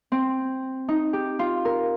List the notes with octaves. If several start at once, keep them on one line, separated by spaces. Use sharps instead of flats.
C4
D#4
G4
F4
A#4